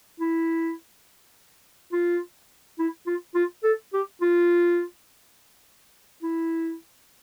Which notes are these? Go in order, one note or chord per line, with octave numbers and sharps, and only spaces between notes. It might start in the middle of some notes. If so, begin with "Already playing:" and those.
E4
F4
E4
F4
F4
A4
G4
F4
E4